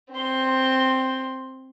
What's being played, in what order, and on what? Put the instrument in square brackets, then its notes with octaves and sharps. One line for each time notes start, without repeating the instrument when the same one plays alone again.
[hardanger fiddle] C4 C6